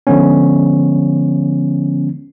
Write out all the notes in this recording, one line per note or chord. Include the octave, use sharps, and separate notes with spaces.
D3 F3 G#3 B3 C#4